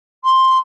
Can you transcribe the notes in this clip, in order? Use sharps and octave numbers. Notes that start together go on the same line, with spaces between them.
C6